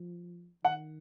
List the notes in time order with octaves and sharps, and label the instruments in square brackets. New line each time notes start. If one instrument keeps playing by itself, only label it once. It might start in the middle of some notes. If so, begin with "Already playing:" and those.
Already playing: [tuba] F3
[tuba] D#3 [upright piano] F#5